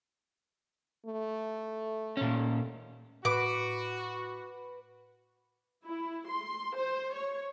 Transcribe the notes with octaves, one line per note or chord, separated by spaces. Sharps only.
A3
A#2 C#4
A2 F#4 B4 D6
E4
C6
C5
C#5